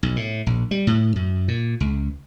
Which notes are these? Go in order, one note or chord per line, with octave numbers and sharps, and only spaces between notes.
B1
A2
A#1
G3
A2
F#2
A#2
C#2